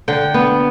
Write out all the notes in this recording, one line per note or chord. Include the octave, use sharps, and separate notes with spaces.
D3 G5
B3